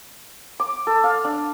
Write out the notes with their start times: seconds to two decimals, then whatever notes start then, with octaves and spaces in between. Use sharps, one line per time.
0.60 D6
0.87 A4
1.04 F5
1.24 D4